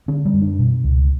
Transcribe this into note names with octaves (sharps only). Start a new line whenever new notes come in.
D3 C#4
G3
F#2
D4
B2
C#2